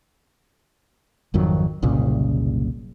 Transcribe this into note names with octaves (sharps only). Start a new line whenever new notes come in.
G#1 F2 D#3 F#3
F#1 C2 A#2 C#3